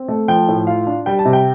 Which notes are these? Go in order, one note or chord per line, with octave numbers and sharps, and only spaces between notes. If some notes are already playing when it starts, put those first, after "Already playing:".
Already playing: C4
A3
F3 G5
A2
F4 F5
D4
G3 G5
A5
C3
G5